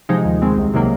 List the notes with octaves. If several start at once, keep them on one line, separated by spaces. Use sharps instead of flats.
C3 F3 G#3 D#4
D#2
D#3 G#3 C4
C2
C3 D#3 F#3 A#3